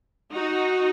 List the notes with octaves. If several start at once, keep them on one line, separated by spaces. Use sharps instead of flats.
D#4 F#4